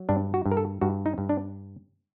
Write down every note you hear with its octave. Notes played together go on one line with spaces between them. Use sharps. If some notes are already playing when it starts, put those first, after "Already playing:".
Already playing: F#3
G2 D4
F#4
G2
A#4
A4
G2 F#4
D#4
G2
D4